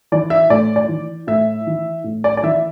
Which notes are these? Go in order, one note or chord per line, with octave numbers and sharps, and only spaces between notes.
E3 D5
E5
A2 D5
D5
E3
A2 E5
E3
A2
D5
D5
E3 E5